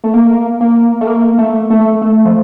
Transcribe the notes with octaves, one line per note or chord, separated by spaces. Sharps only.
A3
A#3
A#3
A3
A#3
A3
A3
A3
F3